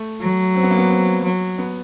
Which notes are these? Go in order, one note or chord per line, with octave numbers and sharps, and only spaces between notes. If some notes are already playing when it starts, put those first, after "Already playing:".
Already playing: A3
F#3
C4
B3
A#3
B3
C4
F#3
B3